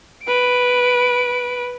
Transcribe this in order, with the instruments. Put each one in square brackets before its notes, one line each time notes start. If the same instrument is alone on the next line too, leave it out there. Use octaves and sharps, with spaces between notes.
[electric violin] B4 D7